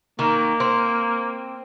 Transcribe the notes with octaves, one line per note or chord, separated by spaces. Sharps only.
D#3 A#3
C4